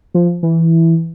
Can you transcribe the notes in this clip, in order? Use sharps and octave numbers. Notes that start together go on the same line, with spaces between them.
F3
E3